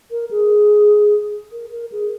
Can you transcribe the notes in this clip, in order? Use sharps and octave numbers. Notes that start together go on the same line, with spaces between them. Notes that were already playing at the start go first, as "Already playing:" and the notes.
A#4
G#4
A#4
A#4
G#4